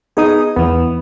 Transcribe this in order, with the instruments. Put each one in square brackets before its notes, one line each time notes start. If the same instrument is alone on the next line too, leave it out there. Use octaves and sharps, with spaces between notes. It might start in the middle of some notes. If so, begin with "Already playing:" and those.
[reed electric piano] B3 D#4 D#6 [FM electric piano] G#4
[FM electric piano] E2 E3 [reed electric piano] B3